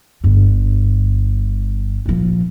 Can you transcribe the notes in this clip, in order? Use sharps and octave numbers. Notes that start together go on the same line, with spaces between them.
G1 G2
A#2 F3